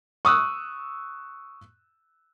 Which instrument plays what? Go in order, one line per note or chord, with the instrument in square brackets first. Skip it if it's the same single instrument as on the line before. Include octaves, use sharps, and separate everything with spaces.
[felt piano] C#6 D#6 E6 F#6